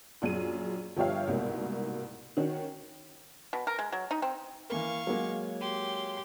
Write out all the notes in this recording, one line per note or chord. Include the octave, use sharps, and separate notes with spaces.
A#1 F#2 G#4 D#7
G1 F3 G4 C#5 E5 F5
C2 G#2 B2 A#3
D#3 C#4 F#4
B2
A#4
G#3
F#3
D#4
C4
E3 A#3 A#4 F5 C#6
F#3 G#3 A#3
G4 C6